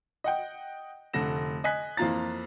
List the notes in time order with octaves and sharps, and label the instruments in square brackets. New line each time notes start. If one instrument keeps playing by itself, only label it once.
[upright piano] D#5 F#5 G5
F1 D3 A3 A#6 E7
D#5 G#5 F#6 B6
F2 E3 A#3 F4 A#5 A6